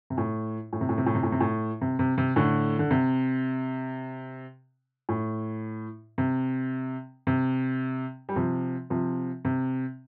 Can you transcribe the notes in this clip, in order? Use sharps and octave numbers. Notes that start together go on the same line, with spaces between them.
C3
A2
A2
C3
A2
C3
A2
C3
A2
C3
A2
C3
C3
C3
A2 D3
D3
C3
A2
C3
C3
G3
C3 F3
C3 F3
C3